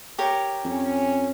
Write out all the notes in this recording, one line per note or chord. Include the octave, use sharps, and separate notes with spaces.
G4 A#4 C#5
F2 C#4